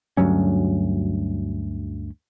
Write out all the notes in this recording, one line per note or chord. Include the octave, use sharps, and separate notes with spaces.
D2 G2 F#3 C#4